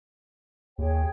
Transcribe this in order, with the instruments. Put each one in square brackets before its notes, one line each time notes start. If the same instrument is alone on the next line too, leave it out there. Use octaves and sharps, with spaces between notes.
[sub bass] D#2 [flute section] G#4 C#5 G5